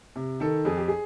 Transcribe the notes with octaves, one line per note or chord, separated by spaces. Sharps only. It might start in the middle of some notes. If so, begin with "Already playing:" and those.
C3
D#3 A4
F2 G#4
G4
G#4